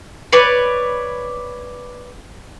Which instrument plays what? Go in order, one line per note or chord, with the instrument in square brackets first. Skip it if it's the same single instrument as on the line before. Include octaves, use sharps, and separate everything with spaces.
[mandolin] B4 C#5 D5